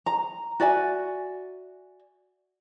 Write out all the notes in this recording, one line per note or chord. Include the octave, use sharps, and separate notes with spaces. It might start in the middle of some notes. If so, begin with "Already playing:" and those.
A#5
F#4 D5 E5 G#5